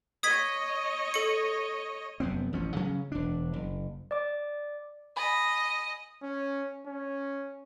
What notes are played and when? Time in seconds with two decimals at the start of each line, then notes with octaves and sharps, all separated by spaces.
0.23 C#5 D#5 D#6 G#6 B6
1.14 A4 C#7
2.20 F1 F#2 B3 C4
2.53 A1 F3 C#4
2.76 C#3 F#3 C#4
3.12 E1 D4
3.53 F#1
4.11 D5 D6
5.17 D#5 G#5 B5
6.23 C#4
6.86 C#4